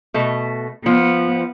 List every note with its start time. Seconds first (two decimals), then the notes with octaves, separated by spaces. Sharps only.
0.14 B2 A3
0.86 F3 B3